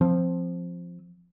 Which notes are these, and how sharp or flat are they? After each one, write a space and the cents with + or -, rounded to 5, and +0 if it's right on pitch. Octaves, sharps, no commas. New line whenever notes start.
F3 +0 C4 +0